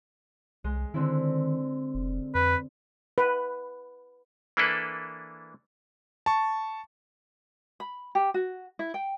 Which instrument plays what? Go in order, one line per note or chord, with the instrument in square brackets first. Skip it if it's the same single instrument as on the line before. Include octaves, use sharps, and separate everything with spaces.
[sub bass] C2 [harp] G#3
[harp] D3 C4 E4 [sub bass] D#3
[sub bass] F1
[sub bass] F2 [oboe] B4
[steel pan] B4
[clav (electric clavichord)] E3 A#3 D4 E4 A4 B4
[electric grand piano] A5 C#6
[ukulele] B5
G4
F#4
E4
G5